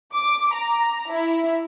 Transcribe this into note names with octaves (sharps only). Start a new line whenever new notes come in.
D6
A#5
E4